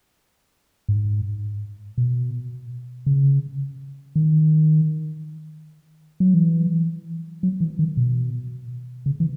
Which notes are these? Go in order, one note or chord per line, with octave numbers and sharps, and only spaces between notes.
G#2
B2
C#3
D#3
F#3
E3
F#3
E3
D#3
B2
C#3
E3